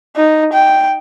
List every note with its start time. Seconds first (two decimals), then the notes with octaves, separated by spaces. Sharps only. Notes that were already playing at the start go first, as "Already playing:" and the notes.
0.16 D#4
0.53 G5